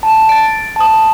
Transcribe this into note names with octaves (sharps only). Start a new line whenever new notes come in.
A5
A6 D7
A5 D#6